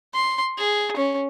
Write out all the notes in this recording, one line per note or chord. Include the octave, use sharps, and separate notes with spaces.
C6
G#4
C#4